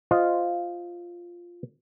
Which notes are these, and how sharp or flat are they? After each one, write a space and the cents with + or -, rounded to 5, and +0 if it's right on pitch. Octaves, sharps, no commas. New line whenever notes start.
F4 +0 C5 +0 D#5 +0